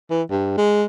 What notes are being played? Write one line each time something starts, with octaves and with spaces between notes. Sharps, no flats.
E3
G2
G#3